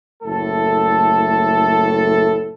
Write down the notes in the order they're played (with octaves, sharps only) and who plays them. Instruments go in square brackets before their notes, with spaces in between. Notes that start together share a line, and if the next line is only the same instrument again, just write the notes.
[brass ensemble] F#1 A2 A3 A4